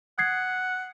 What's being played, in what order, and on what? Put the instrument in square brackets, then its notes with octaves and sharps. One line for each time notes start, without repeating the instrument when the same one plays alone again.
[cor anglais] F#5 [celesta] D#6 G#6 C7